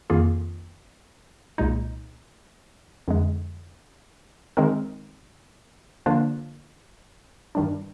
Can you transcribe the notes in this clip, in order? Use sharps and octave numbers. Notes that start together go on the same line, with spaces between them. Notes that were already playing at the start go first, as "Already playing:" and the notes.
F2 D#3 A#3 F4 G#4
C2 A#2 G#3 D#4
F2 D3 G#3
D#3 G#3 C4 D#4 A#4
D3 F3 A#3 D4 F4
G2 D#3 G3 D4